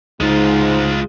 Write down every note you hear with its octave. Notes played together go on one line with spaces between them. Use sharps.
C#2 G#2 G#3 D#4 F4